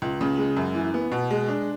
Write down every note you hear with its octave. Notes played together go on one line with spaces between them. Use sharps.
C#2
C#3
G#3
F#2
E3
B3
B2
G#3
D4